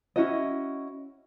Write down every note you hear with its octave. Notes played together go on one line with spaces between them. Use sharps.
C#4 E4 F#4 D#5